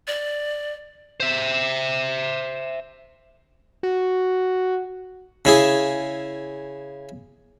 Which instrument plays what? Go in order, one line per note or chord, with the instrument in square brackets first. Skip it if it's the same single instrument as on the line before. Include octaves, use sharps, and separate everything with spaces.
[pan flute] D5
[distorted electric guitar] C5 E5
[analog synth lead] F#4
[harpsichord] C#3 E4 G#4